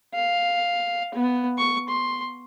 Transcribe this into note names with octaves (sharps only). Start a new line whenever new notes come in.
F5
B3
C#6
C6